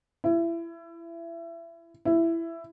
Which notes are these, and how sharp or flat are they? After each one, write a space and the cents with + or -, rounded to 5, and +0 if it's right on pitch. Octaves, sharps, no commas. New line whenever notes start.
E4 +25
E4 +10